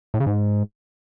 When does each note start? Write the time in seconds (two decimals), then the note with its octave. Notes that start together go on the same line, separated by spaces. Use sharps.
0.14 A2
0.20 C#3
0.26 G#2